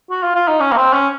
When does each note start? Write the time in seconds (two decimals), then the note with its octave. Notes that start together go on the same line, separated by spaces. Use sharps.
0.10 F#4
0.23 F4
0.35 F4
0.48 D#4
0.60 C#4
0.72 A#3
0.77 C4
0.93 C#4